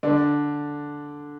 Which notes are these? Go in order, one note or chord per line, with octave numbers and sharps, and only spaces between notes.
D3 D4